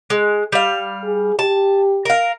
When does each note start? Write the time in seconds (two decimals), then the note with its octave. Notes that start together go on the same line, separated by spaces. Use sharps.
0.10 G#3
0.52 G3 F5
1.04 G#4
1.39 G4 A5
2.05 A#4 F5